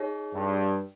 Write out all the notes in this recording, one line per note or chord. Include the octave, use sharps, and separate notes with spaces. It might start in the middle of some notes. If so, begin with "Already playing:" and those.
Already playing: D#4 G#4 C#5
G2